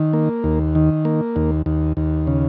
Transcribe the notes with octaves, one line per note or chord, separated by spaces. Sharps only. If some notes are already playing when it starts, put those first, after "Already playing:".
Already playing: D#3
A#3
D#2
D#3
A#3
D#2
D#2
D#2
C#3